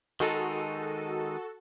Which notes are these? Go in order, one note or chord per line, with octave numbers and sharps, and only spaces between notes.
D#3 G#3 D#4 F#4 A4